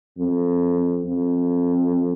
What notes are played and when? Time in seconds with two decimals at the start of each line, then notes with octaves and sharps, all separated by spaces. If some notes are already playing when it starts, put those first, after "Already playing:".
0.18 F2
1.04 F2